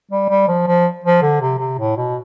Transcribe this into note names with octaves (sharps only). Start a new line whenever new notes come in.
G3
G3
F3
F3
F3
D3
C3
C3
A2
B2